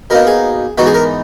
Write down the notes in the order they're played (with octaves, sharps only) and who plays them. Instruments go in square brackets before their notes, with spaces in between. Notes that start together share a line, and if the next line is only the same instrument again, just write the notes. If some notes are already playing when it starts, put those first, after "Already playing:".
[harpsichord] B2 A#3 D#4 A#4
G#4
G#2 E3 B3 D#4 F#4
G#4
A#4